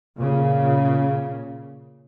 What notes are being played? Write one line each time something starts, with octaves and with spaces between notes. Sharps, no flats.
A#2 C#3